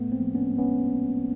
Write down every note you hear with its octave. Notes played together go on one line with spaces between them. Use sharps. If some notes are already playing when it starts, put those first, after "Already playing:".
Already playing: A2 A3 B3
A#3 C4
F3
B3 C#4
G#3
B3 C#4